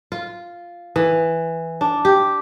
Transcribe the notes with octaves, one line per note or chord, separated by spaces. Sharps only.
F4
E3
D4
G4